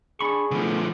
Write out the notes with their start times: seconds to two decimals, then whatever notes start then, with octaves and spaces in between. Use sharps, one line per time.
0.21 D4 G#4 B5 C#6
0.51 D3 F3 A3 B3 C#4